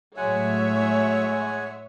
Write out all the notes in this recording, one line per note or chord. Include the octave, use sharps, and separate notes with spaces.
A2 F#3 G#3 C#5 E5 F#5 G#5